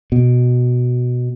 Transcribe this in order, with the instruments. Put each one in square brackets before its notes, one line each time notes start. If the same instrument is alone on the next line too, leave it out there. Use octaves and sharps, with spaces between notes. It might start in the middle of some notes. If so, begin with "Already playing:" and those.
[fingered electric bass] B2